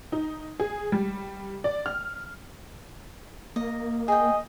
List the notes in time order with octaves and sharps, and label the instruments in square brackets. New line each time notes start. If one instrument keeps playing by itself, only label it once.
[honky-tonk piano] D#4
G#4
G3
D5
F6
[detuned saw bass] A#3 [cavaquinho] D#5
[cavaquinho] G#4 G5 [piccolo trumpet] D#5